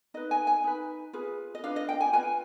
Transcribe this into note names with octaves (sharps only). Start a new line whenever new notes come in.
D#4 B4 D#5
G#5
G#5
D#4 B4
F4 G#4 B4
D#5
D4 F4 B4 F5
D#5
G5
G#5
F4 B4 G#5